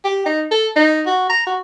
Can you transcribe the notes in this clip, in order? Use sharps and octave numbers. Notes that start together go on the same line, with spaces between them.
G4
D#4
A4
D#4
F#4
A#5
F#4